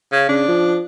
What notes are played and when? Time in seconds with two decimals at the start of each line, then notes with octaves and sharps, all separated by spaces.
0.12 C#3
0.29 C#3 D4
0.48 F3